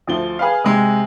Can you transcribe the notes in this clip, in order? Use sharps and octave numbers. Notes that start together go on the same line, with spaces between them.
D2 F3 G7
G#4 B4 F5
C3 G#3